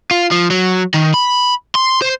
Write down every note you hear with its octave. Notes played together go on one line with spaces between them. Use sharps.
F4
F3
F#3
D#3
B5
C6
C5